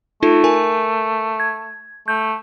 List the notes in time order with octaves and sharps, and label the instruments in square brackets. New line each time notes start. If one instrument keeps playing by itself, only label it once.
[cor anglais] A3 [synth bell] D#4 F4 A4
[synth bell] A#4 G#5
G#6
[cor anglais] A3 [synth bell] G6